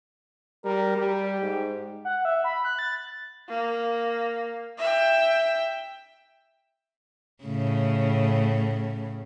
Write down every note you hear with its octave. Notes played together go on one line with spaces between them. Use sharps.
G3 A#4
G3 G4
G#2
F#5
E5
B5
F#6
A6
A#3
E5 G5
A2 C#3